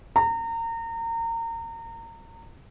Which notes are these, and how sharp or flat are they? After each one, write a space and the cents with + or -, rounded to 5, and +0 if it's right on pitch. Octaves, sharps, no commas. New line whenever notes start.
A#5 -30